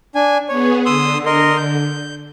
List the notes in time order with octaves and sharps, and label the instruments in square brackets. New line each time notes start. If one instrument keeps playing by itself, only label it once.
[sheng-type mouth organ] D4 G#5
[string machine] B3 G#4 [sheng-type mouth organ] C#5
[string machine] D3 [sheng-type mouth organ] C6 D#6 E6
[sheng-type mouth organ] A#4 D#5 C6
G6